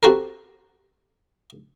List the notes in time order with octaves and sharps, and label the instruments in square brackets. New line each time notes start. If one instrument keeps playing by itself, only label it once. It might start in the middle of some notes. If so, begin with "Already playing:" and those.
[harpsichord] C4 F#4 G4 A4 A#4